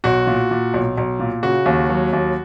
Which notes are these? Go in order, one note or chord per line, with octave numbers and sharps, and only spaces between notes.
B1 F#4
A#2
A#2
B1
B1
A#2
C#3 F#4
D#2
F#3
D#2